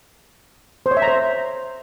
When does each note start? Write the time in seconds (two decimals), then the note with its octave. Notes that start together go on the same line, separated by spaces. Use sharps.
0.86 C5
0.91 C#5
0.97 E5
1.02 A#5
1.08 C5